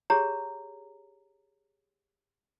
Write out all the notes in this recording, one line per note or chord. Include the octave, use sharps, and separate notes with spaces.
G4 G#4 C#5 A#5